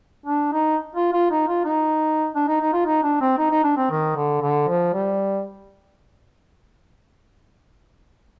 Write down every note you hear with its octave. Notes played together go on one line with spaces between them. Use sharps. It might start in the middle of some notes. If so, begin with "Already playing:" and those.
D4
D#4
F4
F4
D#4
F4
D#4
D4
D#4
D#4
F4
D#4
D4
C4
D#4
D#4
D4
C4
D#3
D3
D3
F3
G3